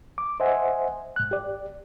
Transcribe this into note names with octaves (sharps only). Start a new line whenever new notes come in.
D6
C5 D#5 E5 F#5 G#5
G#2 F#6
G4 D5